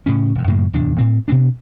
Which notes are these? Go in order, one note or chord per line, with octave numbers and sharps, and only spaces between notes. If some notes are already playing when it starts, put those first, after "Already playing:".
A2 C#3 C#4
E1 F2
F#2 A2 C#3 A#3
D1 E2 C3 D4
A2 C4
B2 B3 C4 D4